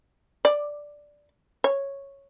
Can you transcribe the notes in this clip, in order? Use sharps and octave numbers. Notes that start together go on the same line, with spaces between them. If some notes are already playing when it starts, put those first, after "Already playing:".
D5
C#5